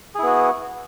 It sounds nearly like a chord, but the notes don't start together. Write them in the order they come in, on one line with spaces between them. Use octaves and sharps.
G#4 E4 B3 F#4